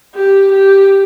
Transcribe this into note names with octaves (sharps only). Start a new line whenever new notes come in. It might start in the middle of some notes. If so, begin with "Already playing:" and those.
G4
G4